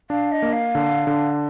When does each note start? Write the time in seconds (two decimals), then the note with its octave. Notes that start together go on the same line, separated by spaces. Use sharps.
0.10 D4 F5
0.32 D#5
0.42 A#3
0.53 F5
0.75 D3
1.07 D3